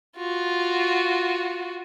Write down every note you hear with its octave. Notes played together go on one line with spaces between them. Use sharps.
F4 F#4